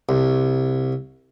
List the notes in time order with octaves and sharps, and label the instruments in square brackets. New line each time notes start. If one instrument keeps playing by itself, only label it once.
[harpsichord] C2